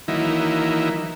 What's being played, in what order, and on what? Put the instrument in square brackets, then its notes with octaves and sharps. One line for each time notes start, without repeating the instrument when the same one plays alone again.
[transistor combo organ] D#3 E3 F#3 A#3 D#4 E4